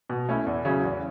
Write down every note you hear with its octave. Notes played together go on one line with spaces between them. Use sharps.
B2
A3 C#4 E4
E2
C#3 F#3 C#4 E4
E2